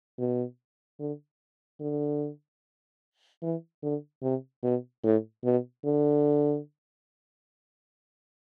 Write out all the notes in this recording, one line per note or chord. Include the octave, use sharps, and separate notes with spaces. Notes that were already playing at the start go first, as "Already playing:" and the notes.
B2
D3
D3
E3
D3
C3
B2
A2
B2
D3